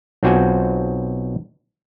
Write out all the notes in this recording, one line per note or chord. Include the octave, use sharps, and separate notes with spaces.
B1 C4 F4 F#4 C5 G#5